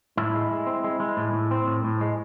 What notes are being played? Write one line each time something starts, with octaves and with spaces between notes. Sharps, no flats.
A2 E4
G#3
G#3
C4
G#3
G#3
A2
A2
C4
A2
A2
G#3